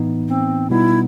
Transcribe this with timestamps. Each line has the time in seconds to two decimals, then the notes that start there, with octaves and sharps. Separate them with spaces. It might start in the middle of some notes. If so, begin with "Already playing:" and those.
Already playing: A2 E3 B3 D#4
0.28 C4
0.70 B2 G3 B3 D#4 E4